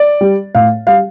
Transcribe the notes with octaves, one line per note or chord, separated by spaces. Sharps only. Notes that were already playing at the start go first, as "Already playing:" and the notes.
Already playing: D5
G3
A2 F5
G3 F5